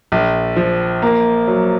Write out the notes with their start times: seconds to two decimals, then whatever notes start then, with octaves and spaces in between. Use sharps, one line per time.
0.12 A#1
0.56 F3
1.02 A#3
1.48 F#3